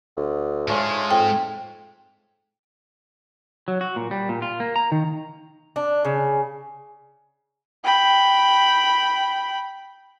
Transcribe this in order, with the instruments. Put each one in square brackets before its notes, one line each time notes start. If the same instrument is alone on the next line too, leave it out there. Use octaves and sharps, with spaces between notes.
[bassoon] D2
[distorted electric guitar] G#2 G#3 [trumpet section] A3 C#4 F4
[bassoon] F2 [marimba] G5
[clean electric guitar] F#3
F#4
A#2
G3
A#2
F4
A#3
A#5
D#3
[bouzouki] D4
C#3
[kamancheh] G5 B5